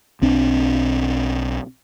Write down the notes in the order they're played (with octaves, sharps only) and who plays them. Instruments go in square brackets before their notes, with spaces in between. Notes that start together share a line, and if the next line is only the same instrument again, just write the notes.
[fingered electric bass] B1 C4 D4